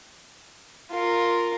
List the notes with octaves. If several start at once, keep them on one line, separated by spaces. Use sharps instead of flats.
F4 A#4